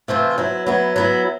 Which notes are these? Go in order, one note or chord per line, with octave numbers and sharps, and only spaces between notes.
C3 E3 A3 C4 F4
F#3 B3 E4
F#3 B3 E4
F#3 B3 E4